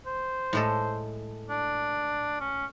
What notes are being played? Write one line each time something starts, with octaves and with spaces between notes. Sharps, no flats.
C5
A2 G#3 A4
D4
C#4